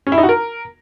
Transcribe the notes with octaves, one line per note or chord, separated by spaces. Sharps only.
C#4
E4
D#4
F#4
A#4